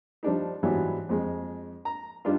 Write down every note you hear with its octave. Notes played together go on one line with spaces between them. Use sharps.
F3 G3 D4 D#4
G#2 E3 F#3 G3 B3 D4
F2 G#3
A#5
G2 D4 D#4 F4